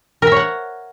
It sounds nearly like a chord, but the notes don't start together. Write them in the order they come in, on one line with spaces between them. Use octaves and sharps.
A#4 E5 C#5 F#5